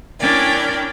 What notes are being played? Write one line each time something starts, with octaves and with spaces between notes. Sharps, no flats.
C#4 D4 E4 A#4 D5 G5